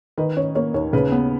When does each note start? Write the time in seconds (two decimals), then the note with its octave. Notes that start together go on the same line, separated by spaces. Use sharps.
0.17 D#3 B4 D#5
0.37 C#4 C#5
0.55 A#3 C#5
0.74 D#2 C#5
0.93 C#3 B4
1.12 B3